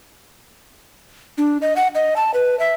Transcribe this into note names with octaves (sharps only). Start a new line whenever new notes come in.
D4
D#5
F#5
D#5
A5
B4
E5